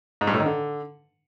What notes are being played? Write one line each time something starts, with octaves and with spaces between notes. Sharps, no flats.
G#2
G2
A2
D#3
D3